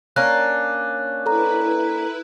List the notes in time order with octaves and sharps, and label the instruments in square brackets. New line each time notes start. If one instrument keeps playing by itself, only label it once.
[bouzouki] A#3 C#4 D4 [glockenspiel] F#6
[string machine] E4 B4 [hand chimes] A4 A#5